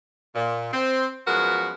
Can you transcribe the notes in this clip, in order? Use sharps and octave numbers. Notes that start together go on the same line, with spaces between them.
A#2
C4
F#2 F3 G#3 B3 F#4 A#4